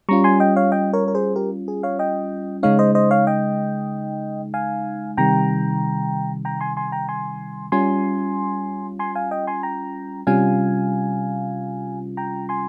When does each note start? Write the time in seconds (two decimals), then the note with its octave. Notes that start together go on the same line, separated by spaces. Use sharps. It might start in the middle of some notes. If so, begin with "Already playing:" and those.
0.09 G3 C#4 F4 A#5 C#6
0.24 G#5 C6
0.40 D#5 G5
0.56 C#5 F5
0.72 D#5 G5
0.93 A#4 C#5
1.08 A#4
1.15 G#4 C5
1.36 G4 A#4
1.68 G#4
1.83 C#5 F5
1.99 D#5 G5
2.63 C#3 G#3 D#4 C#5 F5
2.79 C5 D#5
2.95 C5 D#5
3.11 C#5 F5
3.27 D#5 G5
4.54 F5 G#5
5.17 C3 D#3 G3 G5 A#5
6.45 G5 A#5
6.61 G#5 C6
6.77 G#5 C6
6.92 G5 A#5
7.09 G#5 C6
7.72 G3 C#4 F4 G#5 C6
8.99 G#5 C6
9.15 F5 G#5
9.31 D#5 G5
9.47 G#5 C6
9.63 G5 A#5
10.27 C3 G3 C#4 F4 F5 G#5
12.17 G5 A#5
12.49 G#5 C6